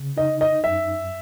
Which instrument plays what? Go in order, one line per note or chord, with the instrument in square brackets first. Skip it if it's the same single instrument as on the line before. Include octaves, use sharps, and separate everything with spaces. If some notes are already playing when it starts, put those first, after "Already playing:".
Already playing: [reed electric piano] C#3
[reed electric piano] D#4 [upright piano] D#5
[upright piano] D#5
[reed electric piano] F#2 [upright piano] E5